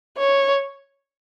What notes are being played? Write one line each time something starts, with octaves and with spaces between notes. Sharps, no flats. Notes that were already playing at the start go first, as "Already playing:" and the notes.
C#5